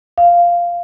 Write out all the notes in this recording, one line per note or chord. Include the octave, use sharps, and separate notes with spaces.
F5